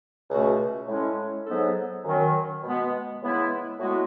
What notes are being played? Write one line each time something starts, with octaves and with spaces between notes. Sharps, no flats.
C#2 B2 A3 C#4 F#4
A2 G#3 C#4
G#2 F#3 B3 D#4 A4
F#2 D#3 F#3 C#4
B2 G#3 B3
C#3 E3 G#3 B3 E4
A2 G#3 B3 F#4